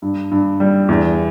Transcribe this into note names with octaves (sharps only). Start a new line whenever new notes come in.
G2
G2
G3
E2